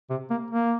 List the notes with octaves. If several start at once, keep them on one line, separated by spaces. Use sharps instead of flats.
C3
A#3
A#3